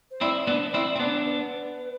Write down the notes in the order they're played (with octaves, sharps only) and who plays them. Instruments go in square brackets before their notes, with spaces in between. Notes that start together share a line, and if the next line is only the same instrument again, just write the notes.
[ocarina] C5
[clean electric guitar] C4 E4 [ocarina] D5
[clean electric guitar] B3 D4
C4 E4
C4
B3 D4
[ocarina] B4